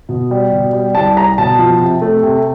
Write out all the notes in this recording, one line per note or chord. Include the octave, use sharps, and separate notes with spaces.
B2
G3
B2
G3
C2 A5
G3 A#5
B2 A5
F3
C3
A3
C3